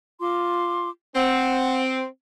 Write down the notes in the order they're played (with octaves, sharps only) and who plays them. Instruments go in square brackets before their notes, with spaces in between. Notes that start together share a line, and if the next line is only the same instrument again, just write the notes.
[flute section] F4 C6 D6
[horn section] C4 [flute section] F#5